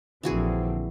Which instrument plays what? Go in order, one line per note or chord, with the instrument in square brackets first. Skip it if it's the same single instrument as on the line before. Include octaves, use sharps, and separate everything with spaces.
[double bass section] A#1 D3 C4 [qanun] E3 F#4 G#4